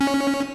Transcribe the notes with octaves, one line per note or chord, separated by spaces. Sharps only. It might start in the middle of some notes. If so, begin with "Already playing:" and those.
C#4